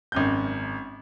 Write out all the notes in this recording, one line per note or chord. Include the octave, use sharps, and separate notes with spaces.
G#1 F#2 G6